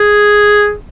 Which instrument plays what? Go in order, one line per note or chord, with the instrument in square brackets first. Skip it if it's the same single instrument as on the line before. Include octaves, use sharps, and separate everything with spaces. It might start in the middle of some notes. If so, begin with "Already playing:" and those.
Already playing: [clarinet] G#4